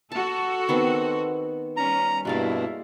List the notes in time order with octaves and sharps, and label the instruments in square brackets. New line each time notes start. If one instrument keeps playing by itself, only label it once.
[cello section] F#4 A4 [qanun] A5
[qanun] D#3 B3 C4
[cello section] G3 C#4 [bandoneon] A#5
[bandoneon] G2 B2 [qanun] G#3 D5 F5 [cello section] A#3 E4